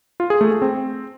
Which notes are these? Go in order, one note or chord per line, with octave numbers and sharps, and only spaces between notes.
F4
G#4
A3
G#4
C4